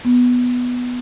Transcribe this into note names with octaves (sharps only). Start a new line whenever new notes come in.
B3